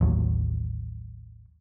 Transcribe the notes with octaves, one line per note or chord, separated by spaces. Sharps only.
A1 D#2 F#3